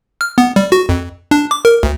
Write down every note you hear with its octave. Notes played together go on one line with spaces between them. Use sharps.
F6
B3
G3
F#4
F2
D4
D6
A#4
D2